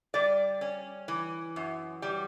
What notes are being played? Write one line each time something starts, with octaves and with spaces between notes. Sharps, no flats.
G3 D5
C#4
E3
F#2
G3